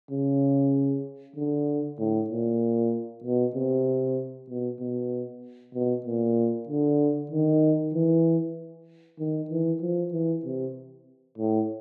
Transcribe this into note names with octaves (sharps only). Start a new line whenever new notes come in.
C#3
D3
A2
A#2
B2
C3
B2
B2
B2
A#2
D3
D#3
E3
D#3
E3
F3
E3
C3
A2